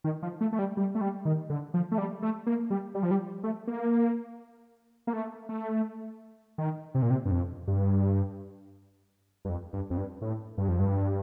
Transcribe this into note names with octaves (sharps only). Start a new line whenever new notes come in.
D#3
F3
A3
A3
G3
G3
A3
G3
D#3
D3
F3
A3
G3
A3
A#3
G3
G3
F3
G3
A3
A#3
A#3
A3
A3
D#3
C3
A#2
C3
G2
F2
G2
G2
F2
G2
F2
G2
A2
G2
F2
G2